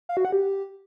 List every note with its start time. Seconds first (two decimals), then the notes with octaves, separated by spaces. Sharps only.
0.09 F5
0.17 F#4
0.25 F#5
0.33 G4